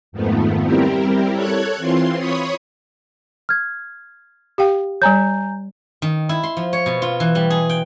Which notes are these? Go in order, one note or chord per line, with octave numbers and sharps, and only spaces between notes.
F2 G#2 D#3 F3 A3 B3
G3 C4 E4 G4 A#4
A4 C#5 F#6 G#6
E3 C4 F4 C6
C#5 B5 C#6 D#6
F6 G#6
G4 F5 G5
G3 C#5 G#5 A#5 G6
D#3
E4
C6
F3
C#5
B2
F4
E3
G3
G#4
G5